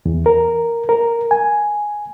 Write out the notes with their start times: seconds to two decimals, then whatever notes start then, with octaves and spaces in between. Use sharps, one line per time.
0.06 E2
0.26 A#4
0.89 A#4
1.31 G#5